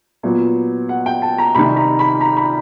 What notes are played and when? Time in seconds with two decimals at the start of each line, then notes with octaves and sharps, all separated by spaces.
0.23 A#2 F#3 B3
0.89 F#5
1.06 G5
1.22 A5
1.38 A#5
1.55 C2 C3 D#3 B5
1.76 A#5
1.99 B5
2.21 A#5
2.37 B5